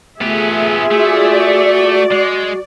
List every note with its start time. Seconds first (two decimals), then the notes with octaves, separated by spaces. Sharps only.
0.21 A3 B3 F4 G4 G#4 E5
0.91 A3 F#4 D5
2.11 G#3